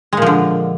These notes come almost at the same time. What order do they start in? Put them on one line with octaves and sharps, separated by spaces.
G#3 A#2 F3 D3